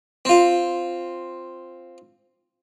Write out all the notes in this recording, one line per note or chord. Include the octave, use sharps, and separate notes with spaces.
C4 F4